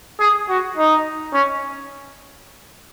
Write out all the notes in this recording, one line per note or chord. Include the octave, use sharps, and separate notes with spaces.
G#4
F#4
D#4
C#4